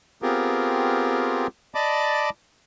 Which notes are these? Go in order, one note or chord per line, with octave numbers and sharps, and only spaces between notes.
B3 C4 F4 G4 G#4 A#4
D5 D#5 A5 B5 D6